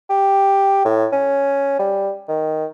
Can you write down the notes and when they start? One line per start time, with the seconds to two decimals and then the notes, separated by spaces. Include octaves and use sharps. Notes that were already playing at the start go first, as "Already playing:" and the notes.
0.10 G4
0.85 A2
1.12 C#4
1.79 G3
2.28 D#3